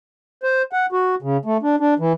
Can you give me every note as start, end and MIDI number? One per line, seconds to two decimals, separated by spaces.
0.43 0.62 72
0.73 0.86 78
0.92 1.15 66
1.22 1.37 49
1.45 1.57 57
1.63 1.76 62
1.80 1.94 62
1.99 2.13 52